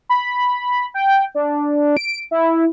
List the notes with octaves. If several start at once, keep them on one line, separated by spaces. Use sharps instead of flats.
B5
G5
D4
D7
E4